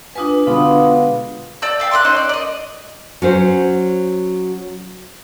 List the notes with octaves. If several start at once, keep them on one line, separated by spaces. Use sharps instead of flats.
D4 F4 B4 G#5 D#6
B2 D3 G#3 B3 D4 F4 B5 D#6
D5 A5 E6 G6
E5 F5 G5
C6 D6 E6 F#6
C#4 D#4 C5 D#5
D5
D5 D#5
F#3 C#4 C5